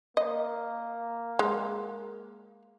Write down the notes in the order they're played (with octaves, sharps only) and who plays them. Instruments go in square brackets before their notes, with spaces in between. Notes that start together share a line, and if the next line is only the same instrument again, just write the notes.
[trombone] A#3 [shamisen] D#5
[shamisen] G#3